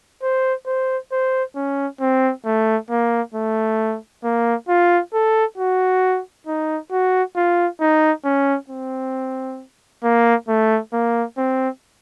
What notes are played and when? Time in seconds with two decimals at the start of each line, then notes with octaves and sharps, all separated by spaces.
0.23 C5
0.66 C5
1.12 C5
1.56 C#4
2.01 C4
2.45 A3
2.90 A#3
3.34 A3
4.24 A#3
4.68 F4
5.13 A4
5.58 F#4
6.47 D#4
6.92 F#4
7.36 F4
7.81 D#4
8.25 C#4
8.70 C4
10.03 A#3
10.48 A3
10.93 A#3
11.38 C4